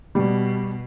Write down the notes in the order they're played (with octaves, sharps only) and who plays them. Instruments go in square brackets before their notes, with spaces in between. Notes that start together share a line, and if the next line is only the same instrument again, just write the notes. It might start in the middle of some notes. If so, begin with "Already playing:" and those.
[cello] B2 [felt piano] G3